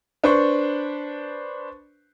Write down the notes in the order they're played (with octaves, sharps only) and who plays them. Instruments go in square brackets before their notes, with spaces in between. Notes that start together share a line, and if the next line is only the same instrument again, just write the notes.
[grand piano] D4 B4 C5 C#6